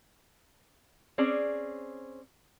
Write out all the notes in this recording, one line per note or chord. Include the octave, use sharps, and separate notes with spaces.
C4 C#4 G#4 D5